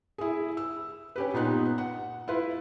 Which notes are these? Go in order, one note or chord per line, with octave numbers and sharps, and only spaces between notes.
E4 G#4
E6
C#4 G4 B4
A#2 B3 D#4 F#6
F#5
E4 F4 B4